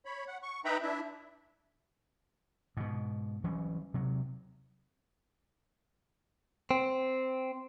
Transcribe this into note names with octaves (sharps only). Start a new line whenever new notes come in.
C#5 B5
F#5
C#6
D#4 B4 E5 G5 A#5 B5
D4 E4 E5
G#2 B2
E3 F#3 G3 C#4
C3 F#3
C4